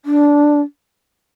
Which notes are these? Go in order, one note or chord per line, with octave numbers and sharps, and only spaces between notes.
D4